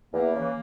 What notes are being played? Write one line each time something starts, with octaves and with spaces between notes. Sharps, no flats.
E2 A#3
C#3 E3